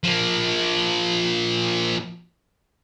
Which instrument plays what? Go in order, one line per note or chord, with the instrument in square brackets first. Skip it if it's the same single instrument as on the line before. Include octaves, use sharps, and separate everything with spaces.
[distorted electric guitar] F3 A#3